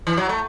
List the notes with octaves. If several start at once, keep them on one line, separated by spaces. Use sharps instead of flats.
E3
F#3
A3